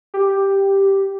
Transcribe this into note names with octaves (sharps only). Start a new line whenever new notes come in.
G4